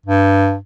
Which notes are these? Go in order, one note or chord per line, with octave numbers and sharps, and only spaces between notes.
G2